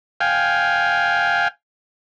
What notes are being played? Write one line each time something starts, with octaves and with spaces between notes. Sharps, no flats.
F5 G5 G#5